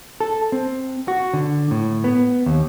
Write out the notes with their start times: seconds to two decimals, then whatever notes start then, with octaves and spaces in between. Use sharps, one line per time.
0.20 A4
0.52 C4
1.08 F#4
1.33 D3
1.71 A2
2.04 B3
2.46 D#2